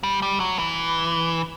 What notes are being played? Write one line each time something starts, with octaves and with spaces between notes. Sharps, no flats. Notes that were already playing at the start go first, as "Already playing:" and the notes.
G3
G3
F#3
E3